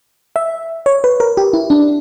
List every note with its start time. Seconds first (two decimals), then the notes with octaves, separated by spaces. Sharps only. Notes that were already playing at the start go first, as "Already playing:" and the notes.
0.36 E5
0.86 C#5
1.04 B4
1.20 A#4
1.37 G4
1.53 E4
1.70 D4